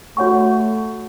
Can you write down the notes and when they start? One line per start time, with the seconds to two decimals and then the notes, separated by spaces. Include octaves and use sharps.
0.17 A3 F#4 C#5 F#5 C#6